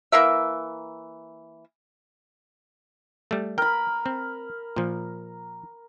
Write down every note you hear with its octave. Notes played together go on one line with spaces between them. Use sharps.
E3 A#3 A#4 E5
G3 A3
A#4 G5 B5
C4
A#2 F3